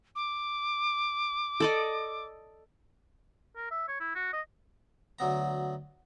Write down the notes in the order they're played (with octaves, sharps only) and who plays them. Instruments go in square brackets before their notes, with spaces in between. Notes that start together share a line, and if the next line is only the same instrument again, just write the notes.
[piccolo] D6
[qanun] A4 D5 D#5
[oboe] A#4
E5
C#5
E4
F#4
D#5
[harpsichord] D2 F#3 B3 A#5